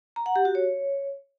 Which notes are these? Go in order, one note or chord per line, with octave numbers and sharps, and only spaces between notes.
A#5
F#5
G4
F#4
C#5